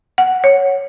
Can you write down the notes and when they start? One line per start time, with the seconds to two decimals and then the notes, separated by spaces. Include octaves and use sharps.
0.18 F#5
0.44 C#5